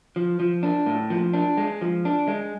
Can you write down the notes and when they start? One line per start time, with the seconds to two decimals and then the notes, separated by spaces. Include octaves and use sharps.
0.16 F3
0.40 F3
0.63 D4
0.86 A2
1.10 F3
1.33 D4
1.57 G#3
1.81 F3
2.05 D4
2.28 G#3